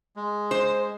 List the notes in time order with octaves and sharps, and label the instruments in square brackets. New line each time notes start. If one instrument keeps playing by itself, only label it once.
[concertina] G#3
[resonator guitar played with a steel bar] C5